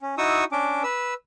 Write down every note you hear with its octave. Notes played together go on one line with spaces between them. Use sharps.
C#4
D#4 E4 F#4 C#6 D#6 E6
C#4 D4 D6
B4 E6